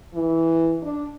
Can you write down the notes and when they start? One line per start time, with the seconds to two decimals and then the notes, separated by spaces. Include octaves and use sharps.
0.14 E3
0.83 D4